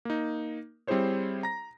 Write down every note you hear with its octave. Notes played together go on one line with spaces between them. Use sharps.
A#3 D#4
G3 C4 E4 G#4 C5 C#5
A#5 A#6